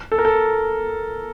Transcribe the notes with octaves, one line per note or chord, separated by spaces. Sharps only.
A4
A#4
A4